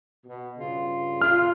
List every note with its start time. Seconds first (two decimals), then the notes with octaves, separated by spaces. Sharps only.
0.25 B2
0.58 G2 C#3 F4
1.21 F4 F6